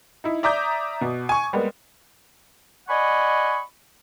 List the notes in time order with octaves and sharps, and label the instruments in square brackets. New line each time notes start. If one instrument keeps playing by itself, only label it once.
[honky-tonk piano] D#4 E4
D5 E5 A#5 D6 D#6 G6
B2
G#5 C#6
G3 G#3 A#3 B3
[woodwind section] D5 D#5 F#5 G#5 B5 C#6